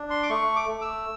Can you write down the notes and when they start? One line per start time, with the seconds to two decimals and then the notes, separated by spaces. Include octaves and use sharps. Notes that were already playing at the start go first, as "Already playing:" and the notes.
Already playing: D4
0.10 C6
0.23 D6
0.30 A3 C#6
0.56 D6
0.69 A3
0.82 E6